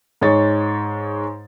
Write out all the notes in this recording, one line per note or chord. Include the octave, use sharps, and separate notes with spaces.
G#2 G#3 C#5 A6